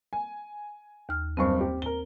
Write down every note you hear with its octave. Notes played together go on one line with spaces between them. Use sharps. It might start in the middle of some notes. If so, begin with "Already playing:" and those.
G#5
D#2 F6
F#1 G2 C4 C5 C#6
G4
A#4 G7